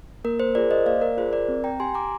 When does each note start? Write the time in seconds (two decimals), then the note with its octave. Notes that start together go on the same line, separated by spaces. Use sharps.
0.24 A#3 A#4
0.40 C5
0.55 F4 G#4 A#4 D5
0.71 C5 D#5
0.86 A#3 D5 F5
1.01 A#4 D5
1.17 F4 G#4 C5
1.33 A#4 D5
1.48 C4
1.64 G5 A#5
1.80 G4 G#5 C6
1.95 A#5 D6